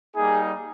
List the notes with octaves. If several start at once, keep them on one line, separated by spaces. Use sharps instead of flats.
G3 A#3 D#4 G#4